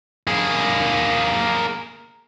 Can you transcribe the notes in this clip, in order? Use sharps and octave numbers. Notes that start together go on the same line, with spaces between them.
A#3 G#4